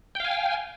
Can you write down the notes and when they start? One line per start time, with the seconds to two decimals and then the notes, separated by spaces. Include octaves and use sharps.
0.15 G5
0.20 F5
0.25 G#5